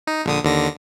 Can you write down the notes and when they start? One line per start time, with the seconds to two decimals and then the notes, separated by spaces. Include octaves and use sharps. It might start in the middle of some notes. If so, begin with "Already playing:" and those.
0.07 D#4
0.26 A#1 D3 D#6
0.44 D#2 D3 A#6